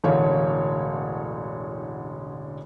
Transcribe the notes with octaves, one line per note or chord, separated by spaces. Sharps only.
E1 A1 D3 C#5 F5